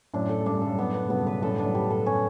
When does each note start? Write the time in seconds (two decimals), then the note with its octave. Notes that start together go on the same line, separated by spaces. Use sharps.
0.14 F#2 A2 D4
0.29 A4
0.41 F#2
0.46 G2 D4
0.57 F#2
0.62 A4
0.67 G2
0.77 F#2 A2 B3
0.94 B3
1.04 C#3
1.10 G2 B2 B3
1.27 B4
1.42 F#2 A2 A4
1.54 G2
1.58 D4
1.64 F#2 A2
1.75 G3
1.90 A4
2.06 C#4